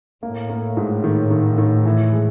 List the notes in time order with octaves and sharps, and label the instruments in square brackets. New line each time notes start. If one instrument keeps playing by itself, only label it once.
[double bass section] A2 [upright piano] A#3
[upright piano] A#3
G#2
D#3
D#3
D#3
E3
G#3